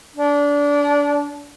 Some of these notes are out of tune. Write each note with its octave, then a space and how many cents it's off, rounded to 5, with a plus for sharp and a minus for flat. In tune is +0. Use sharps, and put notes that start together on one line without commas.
D4 -25